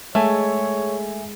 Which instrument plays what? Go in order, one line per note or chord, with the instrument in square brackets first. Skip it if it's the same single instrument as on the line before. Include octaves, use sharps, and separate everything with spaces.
[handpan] G#3 [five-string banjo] A3 [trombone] C#5 [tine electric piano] E5 G#5